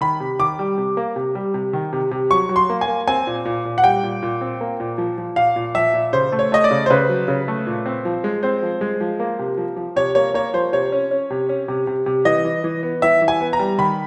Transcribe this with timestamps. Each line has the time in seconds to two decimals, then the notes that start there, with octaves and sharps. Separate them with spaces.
0.01 D#3 B5
0.20 C3
0.39 D#3 D6
0.59 G3
0.78 C3
0.97 A#3
1.16 C3
1.35 G3
1.54 C3
1.73 D#3
1.93 C3
2.11 C3
2.30 F#3 C#6
2.49 F#3
2.56 C6
2.69 A#3
2.81 G#5
2.88 A#3
3.08 C4 G#5
3.27 A#2
3.45 A#2
3.65 A#2
3.78 F#5
3.84 G3 G5
4.03 A#2
4.23 A#2
4.41 C4
4.61 A#3
4.80 A#2
4.98 F3
5.18 F3
5.36 A#2 F5
5.56 A#2
5.75 F3 E5
5.94 A#2
6.13 C#3 C5
6.32 A3
6.39 C#5
6.52 A3 D#5
6.64 D5
6.71 C#3
6.86 C5
6.90 C#3 B4
7.09 F#3
7.28 C#3
7.48 A3
7.67 A#2
7.86 C4
8.05 F3
8.24 G#3
8.43 C4 C5
8.63 F3
8.81 G#3
9.01 F3
9.20 A#3
9.39 C3
9.58 F3
9.76 F3
9.96 C3 C#5
10.15 A#3 C#5
10.34 A#3 C#5
10.54 F3 C5
10.73 C3 C#5
10.92 C#4
11.11 C#4
11.30 C3
11.49 C#4
11.68 C3
11.87 C3
12.06 C3
12.25 E3 D#5
12.44 E3
12.64 E3
12.83 B3
13.02 E3 E5
13.22 E3
13.28 G#5
13.41 B3
13.53 A#5
13.59 G3
13.78 D#3 B5